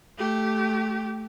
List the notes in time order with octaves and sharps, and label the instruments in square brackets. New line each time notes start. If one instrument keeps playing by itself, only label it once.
[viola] A3 G4